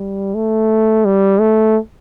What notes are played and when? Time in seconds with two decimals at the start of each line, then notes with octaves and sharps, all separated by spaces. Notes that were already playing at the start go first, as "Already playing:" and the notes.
Already playing: G3
0.35 A3
1.05 G3
1.40 A3